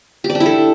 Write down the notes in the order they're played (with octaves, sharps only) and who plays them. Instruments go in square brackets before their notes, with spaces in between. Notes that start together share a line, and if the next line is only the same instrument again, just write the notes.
[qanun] G4
D5
D4
E4
A4